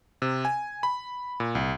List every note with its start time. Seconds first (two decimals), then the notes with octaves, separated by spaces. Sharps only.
0.22 C3
0.45 G#5
0.83 B5
1.40 A#2
1.55 C2